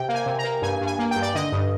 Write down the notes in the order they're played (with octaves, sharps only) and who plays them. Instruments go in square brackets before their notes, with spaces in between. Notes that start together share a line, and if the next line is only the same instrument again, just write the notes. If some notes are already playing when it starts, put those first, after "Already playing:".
Already playing: [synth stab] C3 G5
A#3
G#5
C3
A#5
A#3
G2 G#5
G2
G#5
A#3
G5
G2
D5
D3 D#5
G2